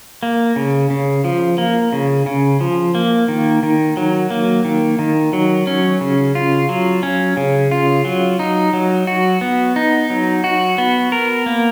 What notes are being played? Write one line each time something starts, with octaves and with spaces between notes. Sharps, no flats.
A#3
C#3
C#3
F3
A#3
C#3
C#3
F3
A#3
D#3
D#3
F#3
A#3
D#3
D#3
F#3
C#4
C#3
F4
F#3
C#4
C#3
F4
F#3
D#4
F#3
F#4
B3
D#4
F#3
F#4
B3
A#4
A#3